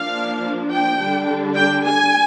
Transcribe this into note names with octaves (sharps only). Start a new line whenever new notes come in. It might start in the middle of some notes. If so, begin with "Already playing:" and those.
Already playing: F3 A#3 D4 F5
G5
D3 G3 D4
G5
G#5